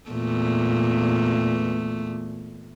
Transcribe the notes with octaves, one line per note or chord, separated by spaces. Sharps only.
E2 A#2 A3